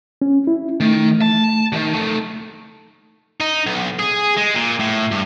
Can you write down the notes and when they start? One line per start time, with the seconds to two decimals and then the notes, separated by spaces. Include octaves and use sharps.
0.22 C#4
0.47 E4
0.80 D#3 A3
1.22 A5
1.72 D#2 D#3
1.94 A3 D#4
3.40 D#4
3.66 B1
3.99 G#4
4.37 G#3
4.55 A#2
4.80 A2
5.11 G2